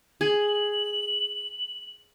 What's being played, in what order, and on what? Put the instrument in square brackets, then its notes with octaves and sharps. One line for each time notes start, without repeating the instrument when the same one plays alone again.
[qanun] G#4 [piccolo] F#7